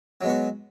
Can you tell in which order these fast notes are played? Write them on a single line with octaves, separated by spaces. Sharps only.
F#3 G#3 B3 F#4